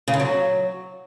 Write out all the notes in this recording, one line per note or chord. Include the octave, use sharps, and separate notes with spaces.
C#3
D3
F#3